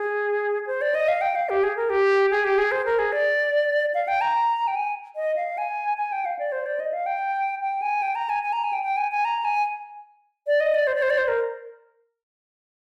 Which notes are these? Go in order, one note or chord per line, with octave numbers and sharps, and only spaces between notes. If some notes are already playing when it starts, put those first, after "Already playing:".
Already playing: G#4
C5
D5
D#5
F5
G5
F5
G4
G#4
A#4
G4
G#4
G4
G#4
C5
A#4
G#4
D5
F5
G5
A#5
G5
G#5
D#5
F5
G#5
G#5
G5
F5
D5
C5
D5
D#5
F5
G5
G5
G#5
G5
A#5
G#5
G#5
A#5
G#5
G5
G5
G#5
G#5
A#5
G#5
D5
D#5
D5
C5
D5
C5
D5
C5
A#4